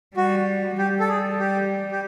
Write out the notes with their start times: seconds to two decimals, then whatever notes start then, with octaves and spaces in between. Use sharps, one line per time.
0.16 G3 F#4
0.78 G3 G4
1.00 A4
1.09 G#4
1.39 G4
1.91 G4